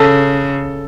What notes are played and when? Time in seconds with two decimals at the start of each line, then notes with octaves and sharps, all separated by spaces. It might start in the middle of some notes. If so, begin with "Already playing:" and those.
Already playing: C#3 A4